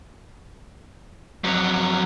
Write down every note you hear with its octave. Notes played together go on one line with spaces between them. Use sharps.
F2 F#3